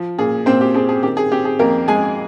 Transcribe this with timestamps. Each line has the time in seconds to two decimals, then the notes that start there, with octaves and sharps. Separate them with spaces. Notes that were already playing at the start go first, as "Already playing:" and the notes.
Already playing: F3
0.18 A#2 G#4
0.46 A#2 C4 C5
0.61 G4
0.74 C4 G#4
0.89 G#4
1.03 D#3 G4
1.17 G#4
1.32 C4 G4
1.45 G#4
1.59 F2 A#3 A#4
1.88 G#3 G#4 G#5